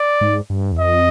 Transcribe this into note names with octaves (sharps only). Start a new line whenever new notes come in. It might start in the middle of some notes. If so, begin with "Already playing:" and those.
Already playing: D5
G#2
G2
E2
F2 D#5